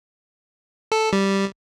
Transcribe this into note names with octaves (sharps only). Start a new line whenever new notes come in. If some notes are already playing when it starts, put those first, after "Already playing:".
A4
G3